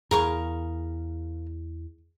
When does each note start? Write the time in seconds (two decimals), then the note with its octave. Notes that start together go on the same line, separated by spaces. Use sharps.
0.11 E2 G#4 A#4 F5 C#6